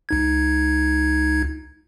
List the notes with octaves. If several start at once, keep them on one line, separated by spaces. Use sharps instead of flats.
C#2 D#4 G#6